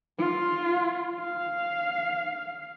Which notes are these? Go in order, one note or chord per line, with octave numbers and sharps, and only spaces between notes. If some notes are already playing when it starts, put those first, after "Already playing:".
F4
F5